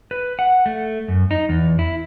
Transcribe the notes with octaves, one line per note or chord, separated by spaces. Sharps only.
B4
F#5
A3
F#2
D#4
E2
E4